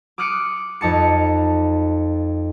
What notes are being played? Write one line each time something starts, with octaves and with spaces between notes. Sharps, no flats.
D6 D#6 F6 F#6 C#7 D7
F2 D#4 A5 C#7